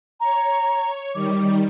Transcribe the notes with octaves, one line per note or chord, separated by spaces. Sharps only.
C#5 A#5
D#3 G3 D6